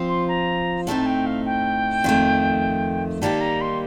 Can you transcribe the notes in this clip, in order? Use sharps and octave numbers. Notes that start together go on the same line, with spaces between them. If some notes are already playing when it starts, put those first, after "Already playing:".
Already playing: F3 C4 F4
C6
A#5
A2 A3 C4 D#4 A5
G5
F5
G5
F2 D#3 A3
D#3 G3 A#3 D#4 G4 A5
A#5
C6